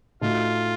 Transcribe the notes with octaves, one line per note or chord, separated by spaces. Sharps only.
A2 A3 D#4 F4 F#4